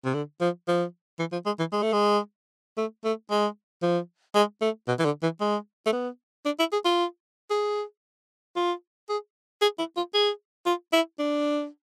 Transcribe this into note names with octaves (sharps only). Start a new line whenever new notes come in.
C3
D3
F3
F3
E3
F3
G#3
E3
G#3
A3
G#3
A3
A3
G#3
F3
G#3
A3
B2
E3
D3
E3
G#3
A3
B3
D4
E4
G#4
F4
G#4
F4
G#4
G#4
E4
F4
G#4
F4
E4
D4